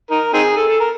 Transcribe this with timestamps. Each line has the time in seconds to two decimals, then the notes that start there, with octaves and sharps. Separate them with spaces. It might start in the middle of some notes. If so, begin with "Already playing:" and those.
0.11 D#4 A#4
0.34 C4 D#4 G#4
0.57 A4
0.68 A4
0.80 A#4